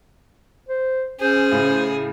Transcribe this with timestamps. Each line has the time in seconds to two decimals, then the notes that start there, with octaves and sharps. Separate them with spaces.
0.69 C5
1.20 C#4 G#4 C5
1.52 A2 C#3